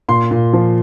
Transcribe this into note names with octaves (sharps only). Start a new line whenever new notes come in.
A#2 C6
A#2
F3